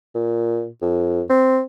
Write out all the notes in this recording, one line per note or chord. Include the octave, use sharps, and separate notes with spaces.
A#2
F2
C4